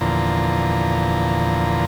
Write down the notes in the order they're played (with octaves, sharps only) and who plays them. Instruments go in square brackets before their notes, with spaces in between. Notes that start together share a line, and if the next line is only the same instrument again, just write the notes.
[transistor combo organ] E2 A#2 D3 F3 A#5